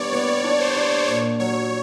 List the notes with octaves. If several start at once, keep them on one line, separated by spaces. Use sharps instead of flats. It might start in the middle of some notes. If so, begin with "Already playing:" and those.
Already playing: G3 B3 D4 C#5 D5
B3 C#5
D4
C5
D4
A#2 C#5
F#3 C#5